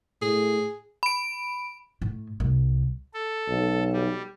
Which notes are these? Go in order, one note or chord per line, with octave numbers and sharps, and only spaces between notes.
A2 G#4
B5 D7
A2
C2
A4
B1
G3